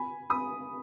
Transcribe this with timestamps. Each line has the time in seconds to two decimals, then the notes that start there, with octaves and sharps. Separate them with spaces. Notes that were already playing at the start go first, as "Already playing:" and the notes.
Already playing: G#5 B5
0.30 B5 D#6